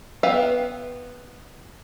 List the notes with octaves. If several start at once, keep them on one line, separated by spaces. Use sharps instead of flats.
B3 B4 E5 F5 G5